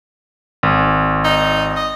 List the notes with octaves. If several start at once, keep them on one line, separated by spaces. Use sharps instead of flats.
G#1
D#4
D#5